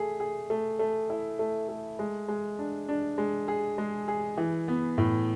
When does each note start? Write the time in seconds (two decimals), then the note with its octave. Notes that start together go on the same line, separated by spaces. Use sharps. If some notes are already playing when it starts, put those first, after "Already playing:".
Already playing: A3 G#4
0.20 G#4
0.50 A3
0.79 A3
1.10 E4
1.39 A3
1.69 A3
1.99 G#3
2.28 G#3
2.59 D4
2.89 D4
3.18 G#3
3.48 G#4
3.78 G#3
4.08 G#4
4.37 E3
4.68 B3
4.98 A2